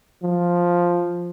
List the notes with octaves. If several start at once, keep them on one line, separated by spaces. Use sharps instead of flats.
F3